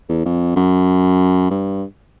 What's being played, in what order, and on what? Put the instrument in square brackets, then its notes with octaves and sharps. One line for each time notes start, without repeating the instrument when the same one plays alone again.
[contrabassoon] E2
F2
F#2
G2